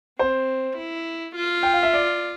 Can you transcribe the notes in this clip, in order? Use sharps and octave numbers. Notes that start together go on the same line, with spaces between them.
C4 C5
E4
F4
G5
F5
E5
D5